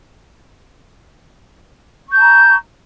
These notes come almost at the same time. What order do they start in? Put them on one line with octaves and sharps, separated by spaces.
C#6 G6 A5 A#5